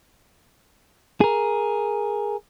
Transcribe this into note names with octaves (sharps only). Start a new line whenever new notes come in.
G#4 A#4